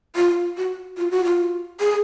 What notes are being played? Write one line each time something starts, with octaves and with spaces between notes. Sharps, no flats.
F4
F#4
F4
F#4
F4
G#4